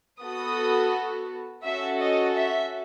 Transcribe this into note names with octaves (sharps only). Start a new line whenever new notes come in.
B3 F#4 A4 D#6
C#4 F#4 A4 E5
D#5
E5